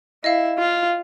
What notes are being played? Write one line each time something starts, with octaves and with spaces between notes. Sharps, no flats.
E4 D#5 F5
F4